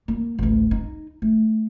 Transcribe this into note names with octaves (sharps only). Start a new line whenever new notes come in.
A#3
A1 D2
D#4
A3